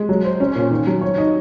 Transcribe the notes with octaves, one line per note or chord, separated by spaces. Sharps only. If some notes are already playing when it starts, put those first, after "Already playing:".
Already playing: G#3
F#3
C5
C#4
A#2
D#3
F#3
C#5
D#4